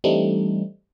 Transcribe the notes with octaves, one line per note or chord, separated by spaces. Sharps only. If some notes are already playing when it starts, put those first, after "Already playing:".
E3 G3 A3 C4 D4 D#4